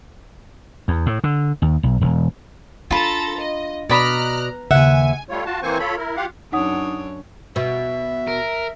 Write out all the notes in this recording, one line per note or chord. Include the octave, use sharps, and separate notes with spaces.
E2
A2
D3
D#2
B1
E1
D4 F4 A4 A#5 B5 A6
D#5
B2 D5 D#5 A#5 B5 F6 F#6
D#2 C#3 E5 F#5 G#5
G3 A3 F4 C#5
F4 F#4 A5
E3 A#3 C4 C5 G#5 C#6
F4 A4 C#5 B5
E4 A#4
F4 G4 F5 F#5
F#2 D4 D#4 C#5 F#5 D#6
B2 E5
A#4